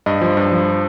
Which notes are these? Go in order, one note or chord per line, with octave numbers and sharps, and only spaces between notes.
G2 D#5
F3
G2
F3